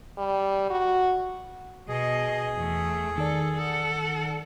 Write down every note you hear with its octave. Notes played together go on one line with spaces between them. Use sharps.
G3
F#4
B2 G#4 D#5
E2 A3
D#3 A4 D5
A4 F#5